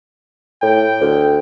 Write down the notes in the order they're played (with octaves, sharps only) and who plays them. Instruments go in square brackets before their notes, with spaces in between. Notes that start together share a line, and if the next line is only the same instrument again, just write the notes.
[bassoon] A2 [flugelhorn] G5
[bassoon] D2